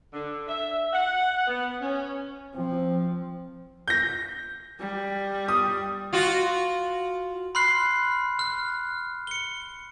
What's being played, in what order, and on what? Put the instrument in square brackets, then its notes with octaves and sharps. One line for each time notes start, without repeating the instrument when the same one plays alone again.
[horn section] D3
E5
F#5
B3
C#4
[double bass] F3 [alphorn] C4
[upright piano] G6 A#6
[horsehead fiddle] G3
[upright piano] D#6
[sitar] F4 F#4
[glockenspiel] B5 C6 F6 F#6 C7
F6 F#6
C#7 G7